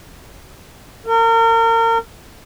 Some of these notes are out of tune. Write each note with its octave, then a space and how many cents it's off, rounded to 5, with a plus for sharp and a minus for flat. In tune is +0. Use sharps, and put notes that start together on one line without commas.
A#4 -35